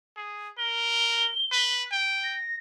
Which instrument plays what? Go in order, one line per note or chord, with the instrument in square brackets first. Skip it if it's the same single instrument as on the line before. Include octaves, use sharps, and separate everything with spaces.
[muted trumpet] G#4
[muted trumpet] A#4 [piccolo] G7
[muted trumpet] B4
G5
[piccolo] A#6